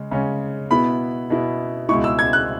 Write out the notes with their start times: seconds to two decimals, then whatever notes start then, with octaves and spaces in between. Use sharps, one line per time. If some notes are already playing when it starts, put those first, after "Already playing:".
Already playing: C#3 G#3
0.11 C#3 G#3 C#4
0.70 B2 B3 E4 B5
1.30 B2 B3 E4
1.89 C#2 B2 G#3 E4 C#6
2.04 E6
2.19 G#6
2.33 F#6